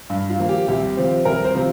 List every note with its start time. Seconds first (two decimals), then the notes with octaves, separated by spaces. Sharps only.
0.10 G2
0.30 F4
0.39 F3 A#3
0.49 G4
0.67 C2 G4
0.97 C3 F3 C4
1.25 C2 A#4
1.44 C5
1.54 C3 F3 C4